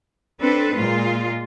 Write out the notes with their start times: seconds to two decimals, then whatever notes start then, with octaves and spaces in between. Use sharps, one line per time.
0.40 C4 D4 A4 B4
0.75 A#2 G#3 F4